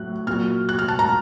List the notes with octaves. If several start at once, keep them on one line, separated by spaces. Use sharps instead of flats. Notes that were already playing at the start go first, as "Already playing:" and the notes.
Already playing: A2 F#3 F#6
A#2 F#3 F6
F#6
F6
A5
A#5